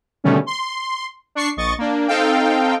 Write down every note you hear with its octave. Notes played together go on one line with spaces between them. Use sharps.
B2 D3 D#3 G3 A3 C#4
C6
D4 C#6 C7
A#1 D#5 C#6 A6
A#3 D4
C4 D#4 A4 F5 G5